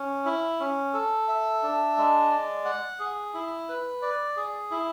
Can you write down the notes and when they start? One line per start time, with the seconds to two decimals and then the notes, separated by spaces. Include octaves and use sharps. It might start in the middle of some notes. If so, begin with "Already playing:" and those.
Already playing: C#4
0.25 E4
0.60 C#4
0.93 A4
1.28 E5
1.63 D4
1.97 G#3
2.31 D5
2.65 F#5
3.00 G#4
3.34 E4
3.69 B4
4.02 D5
4.37 G#4
4.71 E4